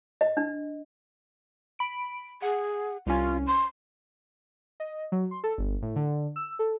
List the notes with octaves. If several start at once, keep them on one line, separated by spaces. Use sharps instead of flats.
D#5
D4
B5 D7
G#4 F#5
C2 C#4 F4
C6
D#5
F#3
C6
A4
G1
A2
D3
E6
A4